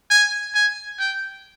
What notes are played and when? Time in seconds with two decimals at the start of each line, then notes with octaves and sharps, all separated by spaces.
0.10 G#5
0.55 G#5
0.99 G5